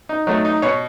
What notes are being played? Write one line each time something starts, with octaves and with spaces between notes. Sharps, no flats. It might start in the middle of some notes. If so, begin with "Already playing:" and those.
D#4
F#3 A3 D#4
D#4
B2 C#5